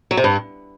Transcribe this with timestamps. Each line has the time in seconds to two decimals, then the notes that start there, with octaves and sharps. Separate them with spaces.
0.11 F#3
0.17 C3
0.24 G2